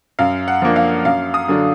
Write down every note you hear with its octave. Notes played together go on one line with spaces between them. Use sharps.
F#2 F5
F#5
F3 A#3 D4
F5
F#2 F5
D#6
D3 F#3 D4